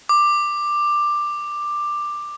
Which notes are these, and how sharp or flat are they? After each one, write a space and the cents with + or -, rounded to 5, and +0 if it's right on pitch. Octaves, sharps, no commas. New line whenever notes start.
D6 +10